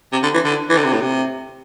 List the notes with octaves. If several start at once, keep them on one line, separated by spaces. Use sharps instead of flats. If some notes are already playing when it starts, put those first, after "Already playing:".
C3
D3
E3
D3
E3
D3
C3
A2
C3